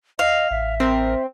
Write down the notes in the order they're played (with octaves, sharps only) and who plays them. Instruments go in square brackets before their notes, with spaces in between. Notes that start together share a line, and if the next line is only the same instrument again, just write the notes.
[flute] D#5 [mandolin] F5
[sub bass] A1 [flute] E5
[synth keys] C4 [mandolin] A#4